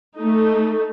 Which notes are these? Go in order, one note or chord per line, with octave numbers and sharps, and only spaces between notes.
A3 D#4